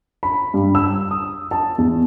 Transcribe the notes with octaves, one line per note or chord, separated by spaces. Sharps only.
B5
G2
E6
D#6
A5
E2